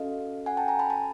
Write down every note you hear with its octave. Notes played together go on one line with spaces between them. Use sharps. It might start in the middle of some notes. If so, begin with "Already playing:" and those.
Already playing: C#4 F#4 A4 D#5 F5
F#5 G#5
G5 A5
G#5 A#5
A5 B5
A5 B5